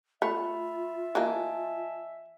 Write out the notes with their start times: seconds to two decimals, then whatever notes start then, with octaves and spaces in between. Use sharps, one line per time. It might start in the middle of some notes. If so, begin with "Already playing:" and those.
0.22 A3 F4 E5 B5
1.15 E3 A#3 D#5 G#5 A5